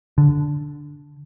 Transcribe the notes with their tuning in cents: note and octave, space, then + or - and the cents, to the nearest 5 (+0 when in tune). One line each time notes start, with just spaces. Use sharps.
D3 -5